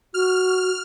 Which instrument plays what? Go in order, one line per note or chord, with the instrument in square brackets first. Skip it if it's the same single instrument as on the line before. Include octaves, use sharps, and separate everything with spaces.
[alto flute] F#4 [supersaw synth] F6